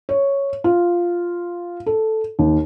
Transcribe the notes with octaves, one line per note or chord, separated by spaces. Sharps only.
C#5
F4
A4
D#2